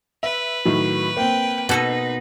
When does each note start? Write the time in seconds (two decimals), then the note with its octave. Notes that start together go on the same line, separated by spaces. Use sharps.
0.23 B4 E5
0.65 A2 D#3 F#3
1.17 A#3 C4 G5
1.69 B2 D#4 A4 D#5